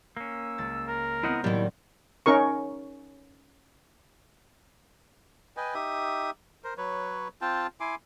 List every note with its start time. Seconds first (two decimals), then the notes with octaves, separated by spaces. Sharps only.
0.17 A#3 C#4 E6
0.58 C#2 A6
0.87 A#4
1.23 B3 C4 E4 D#5 F#5
1.44 A2 D#3 F#3 G3 A#3 E4
2.26 C#4 D#4 A#4 C#6
5.57 B4 D#5 G5 G#5
5.74 D#4 G4 E5 D#6
6.64 A#4 C5
6.78 F#3 B4 C#5
7.41 C4 F4 G5 A5
7.80 E4 G#5 C6 D6